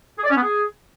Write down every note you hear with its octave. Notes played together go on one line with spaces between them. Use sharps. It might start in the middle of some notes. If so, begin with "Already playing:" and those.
G#4
D5
C#4
B3
G#4